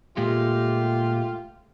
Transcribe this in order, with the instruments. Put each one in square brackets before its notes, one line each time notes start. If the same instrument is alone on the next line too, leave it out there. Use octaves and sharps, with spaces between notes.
[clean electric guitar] A#2 G#3 [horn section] A3 F4 G4